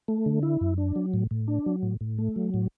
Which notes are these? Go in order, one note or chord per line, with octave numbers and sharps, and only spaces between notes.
A3
D3
E4
F#2
D4
F#3
A2
A2
D4
F#3
A2
A2
A3
F#3
A2